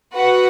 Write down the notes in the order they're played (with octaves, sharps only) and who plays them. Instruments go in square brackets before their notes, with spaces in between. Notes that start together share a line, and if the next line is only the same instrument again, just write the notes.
[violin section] F#4 B4 F#5